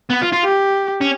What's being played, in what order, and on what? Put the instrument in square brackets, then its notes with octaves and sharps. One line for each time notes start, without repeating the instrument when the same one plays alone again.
[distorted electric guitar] B3
F4
F4
[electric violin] G4
[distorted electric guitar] C#4